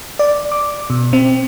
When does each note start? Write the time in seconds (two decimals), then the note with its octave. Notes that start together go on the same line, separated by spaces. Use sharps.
0.19 D5
0.52 D6
0.90 B2
1.13 C4